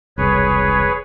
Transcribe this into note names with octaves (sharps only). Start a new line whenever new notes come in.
E1 C2 G#4 B4 C#5